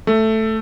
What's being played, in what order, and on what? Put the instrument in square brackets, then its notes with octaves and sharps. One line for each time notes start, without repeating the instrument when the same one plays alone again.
[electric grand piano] A3